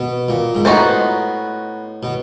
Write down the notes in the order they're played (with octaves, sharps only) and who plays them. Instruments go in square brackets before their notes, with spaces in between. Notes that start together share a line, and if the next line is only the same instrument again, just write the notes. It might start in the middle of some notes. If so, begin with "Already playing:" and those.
Already playing: [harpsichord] B2
A#2
G#2
[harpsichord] A2 [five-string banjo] B3 D#4 F#4 A4 C5
[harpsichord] B2